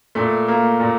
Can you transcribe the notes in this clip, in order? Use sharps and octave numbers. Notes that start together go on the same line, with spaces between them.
A#2 A3
A#3
A#2